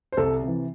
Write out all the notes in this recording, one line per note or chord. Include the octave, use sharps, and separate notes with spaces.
C5
C2 A4
C3 E3